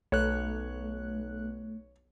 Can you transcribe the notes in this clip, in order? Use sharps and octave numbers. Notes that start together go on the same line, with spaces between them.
B1 A3 C#5 F#6